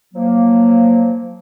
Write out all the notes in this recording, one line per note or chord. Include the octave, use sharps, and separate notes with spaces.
F3 F#3 A#3